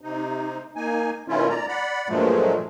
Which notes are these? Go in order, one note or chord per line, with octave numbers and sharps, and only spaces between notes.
C3 D#4
A#3 D#4 G#5
B2 D#3 A3 C#4 E4 F4
D5 A#5
D5 F#5 B5
G2 A#2 F3 F#3 G#3 A3